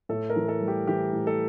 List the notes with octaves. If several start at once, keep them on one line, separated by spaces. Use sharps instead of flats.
A2 A4
A#4
E3
A4
G3
G4
E3 G4
A2
A4